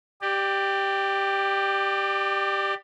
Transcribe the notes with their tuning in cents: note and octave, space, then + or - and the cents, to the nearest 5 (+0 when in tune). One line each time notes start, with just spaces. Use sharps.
G4 +0 D5 +30